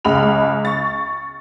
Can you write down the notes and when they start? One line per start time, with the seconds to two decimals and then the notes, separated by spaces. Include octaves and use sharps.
0.05 C#2 C#3 B5 F7
0.65 C#6 A6